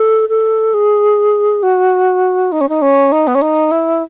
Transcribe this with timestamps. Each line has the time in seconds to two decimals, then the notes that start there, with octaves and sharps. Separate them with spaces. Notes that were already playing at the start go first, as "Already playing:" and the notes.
Already playing: A4
0.29 A4
0.74 G#4
1.63 F#4
2.52 D#4
2.61 C#4
2.69 D#4
2.82 C#4
3.12 D#4
3.27 B3
3.35 C#4
3.42 D#4
3.71 E4